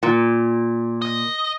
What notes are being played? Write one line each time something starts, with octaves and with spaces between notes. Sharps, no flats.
A#2
D#5